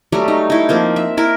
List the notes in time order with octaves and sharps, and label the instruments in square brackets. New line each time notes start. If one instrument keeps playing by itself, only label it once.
[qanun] F#3 G3 A3
D#4
D#4 E4
F3 A#3 C4
E5
E4 A#4